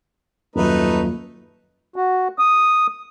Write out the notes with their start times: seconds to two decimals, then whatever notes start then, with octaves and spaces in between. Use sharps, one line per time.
0.56 D#1 F#2 A3 D#4 F4 B4
1.96 F#4
2.39 D#6